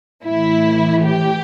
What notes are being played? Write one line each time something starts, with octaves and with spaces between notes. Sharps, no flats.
A2 E3 E4
G4